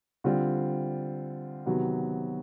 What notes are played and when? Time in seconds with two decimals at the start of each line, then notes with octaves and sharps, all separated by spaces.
0.24 D3 G3 C4 F4
1.66 C3 D#3 F#3 B3